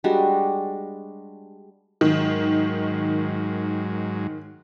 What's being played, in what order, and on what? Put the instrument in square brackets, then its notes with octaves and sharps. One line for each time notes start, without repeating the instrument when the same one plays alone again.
[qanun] G3 G#3 D4 F#4
[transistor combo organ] G#2 F#3 [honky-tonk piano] D#3